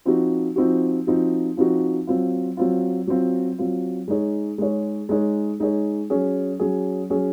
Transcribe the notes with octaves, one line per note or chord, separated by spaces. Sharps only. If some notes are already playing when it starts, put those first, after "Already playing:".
F3 C4 D#4 F#4
F3 C4 D#4 F#4
F3 C4 D#4 F#4
F3 C4 D#4 F#4
F#3 C4 F4
F#3 C4 F4
F#3 C4 F4
F#3 C4 F4
G#3 D#4 G#4 C#5
G#3 D#4 G#4 C#5
G#3 D#4 G#4 C#5
G#3 D#4 G#4 C#5
F#3 C#4 G#4
F#3 C#4 G#4
F#3 C#4 G#4